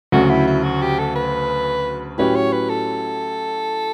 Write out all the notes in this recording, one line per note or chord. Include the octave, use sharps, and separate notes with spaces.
D2 C#3 F#3 F#4
E4
E4
F#4
G4
A4
B4
A2 F#3 C#4 G4 B4
C#5
B4
A4